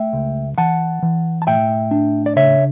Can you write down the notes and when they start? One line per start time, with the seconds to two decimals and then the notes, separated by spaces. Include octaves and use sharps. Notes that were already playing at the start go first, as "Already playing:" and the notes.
Already playing: A3 E5 G5
0.13 C#2
0.58 E3 F#5 A5
1.03 E3
1.42 A5
1.47 A2 E5 G5
1.91 D4
2.26 D5
2.36 C#3 C#5 E5